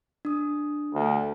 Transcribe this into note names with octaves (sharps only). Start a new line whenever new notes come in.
D4 D#6
D2